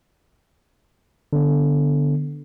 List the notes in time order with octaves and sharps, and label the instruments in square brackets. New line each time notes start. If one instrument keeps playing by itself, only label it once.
[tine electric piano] D3 B3